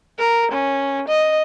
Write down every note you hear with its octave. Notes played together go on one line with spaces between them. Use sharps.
A#4
C#4
D#5